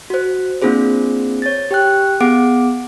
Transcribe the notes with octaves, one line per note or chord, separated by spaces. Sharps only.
F#4 C5
A#3 C4 D4 F4 G#4 C5
C#5 A6
G4 G5 F#6
B3 G#4 F#5 D6 D7